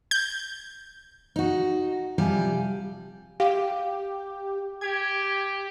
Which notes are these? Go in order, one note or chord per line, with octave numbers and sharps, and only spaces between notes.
G6
D#4 F#4
C3 F3 G3 G4 G#5
G4 F5
G4 G#6